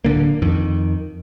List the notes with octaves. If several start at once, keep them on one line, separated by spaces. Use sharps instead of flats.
D1 G1 D3 A#3
F2 D#3